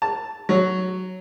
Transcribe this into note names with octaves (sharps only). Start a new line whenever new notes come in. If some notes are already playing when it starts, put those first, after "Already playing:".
A5
F#3